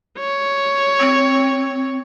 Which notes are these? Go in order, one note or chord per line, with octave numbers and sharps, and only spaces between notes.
C#5
C4